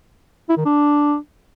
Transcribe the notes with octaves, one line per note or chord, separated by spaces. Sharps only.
E4
D#3
D4